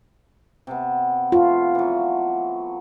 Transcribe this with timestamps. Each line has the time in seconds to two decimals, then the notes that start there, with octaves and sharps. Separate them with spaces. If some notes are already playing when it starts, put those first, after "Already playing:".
0.67 C3 B3
1.32 A3 F4
1.75 E3 F#3